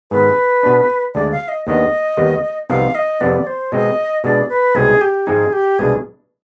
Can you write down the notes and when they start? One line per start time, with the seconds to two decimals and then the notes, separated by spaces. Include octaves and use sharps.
0.11 G#2 D#3 B3 B4
0.63 B2 B3 D4
1.15 D2 D3 G#3 D4 D5
1.32 F5
1.48 D#5
1.66 D#2 D#3 B3 D4 D#5
2.17 D#2 D#3 G3 B3
2.70 C2 C3 F3 B3 D#4 F5
2.95 D#5
3.21 F2 C3 F3 B3 D5
3.47 C5
3.72 B2 G#3 C4 D#5
4.24 B2 G#3 D4 D5
4.49 B4
4.75 C2 B2 G#3 C4 D#4 G#4
5.01 G4
5.27 G#2 F3 G#3 C4 D#4 G#4
5.53 G4
5.79 C2 B2 G#3 D4 G#4